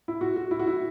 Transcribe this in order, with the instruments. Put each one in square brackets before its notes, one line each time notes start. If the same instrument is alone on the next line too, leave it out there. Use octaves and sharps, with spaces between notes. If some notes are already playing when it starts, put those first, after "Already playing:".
[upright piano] E4
F#4
F#4
E4
F#4
E4